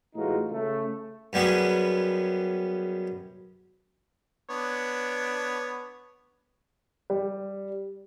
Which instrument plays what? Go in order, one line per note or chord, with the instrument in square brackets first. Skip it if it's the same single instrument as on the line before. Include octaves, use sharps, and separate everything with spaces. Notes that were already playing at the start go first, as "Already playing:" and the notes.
[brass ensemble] A2 E3 G#3 D#4 F4 F#4
C#3 A3
[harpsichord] F#2 G3 B3 G#4
[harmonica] B3 D4 C#5
[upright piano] G3